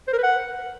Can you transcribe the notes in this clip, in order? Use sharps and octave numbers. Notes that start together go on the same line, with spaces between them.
C5
A#4
B4
F#5